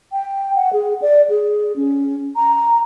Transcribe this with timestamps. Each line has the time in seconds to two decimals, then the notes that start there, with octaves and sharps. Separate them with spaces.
0.12 G5
0.56 F#5
0.73 G#4
1.02 D5
1.30 G#4
1.76 C#4
2.36 A#5